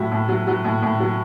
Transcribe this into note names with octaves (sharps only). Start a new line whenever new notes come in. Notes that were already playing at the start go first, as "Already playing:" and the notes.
Already playing: A2 F#3 E5
A2
F#3
F#3
A2
A2
F#3